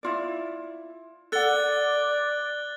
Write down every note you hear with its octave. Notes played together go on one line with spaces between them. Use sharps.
E4 F4 D5
A4 D5 F#5 F#6 A6 G7